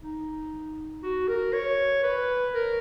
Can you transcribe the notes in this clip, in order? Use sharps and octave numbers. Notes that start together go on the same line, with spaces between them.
D#4
F#4
A#4
C#5
B4
A#4